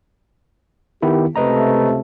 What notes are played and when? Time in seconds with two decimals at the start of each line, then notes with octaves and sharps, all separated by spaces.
1.02 D#3 B3 E4 G4
1.36 C#2 C3 A3 B4 D#5 A#5